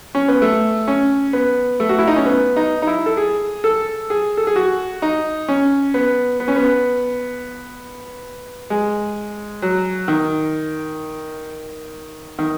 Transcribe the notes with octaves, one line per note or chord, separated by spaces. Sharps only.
C#4
B3
A3
C#4
B3
A3
F#4
E4
D#4
C#4
B3
D#4
D#4
E4
A4
G#4
A4
G#4
A4
G#4
F#4
D#4
C#4
B3
B3
C#4
B3
G#3
F#3
D#3
D#3